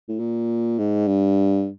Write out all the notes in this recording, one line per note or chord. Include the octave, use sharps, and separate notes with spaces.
A2
A#2
G#2
G2